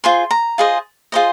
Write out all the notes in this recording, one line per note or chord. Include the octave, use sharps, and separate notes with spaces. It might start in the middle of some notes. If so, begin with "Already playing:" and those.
F4 G#4 C5 C6
A#5
F4 G#4 C5 D#5
F4 G#4 C5 D#5